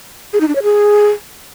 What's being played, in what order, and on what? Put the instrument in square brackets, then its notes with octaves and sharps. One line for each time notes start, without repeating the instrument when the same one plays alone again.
[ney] G#4
D#4
D4
C#5
G#4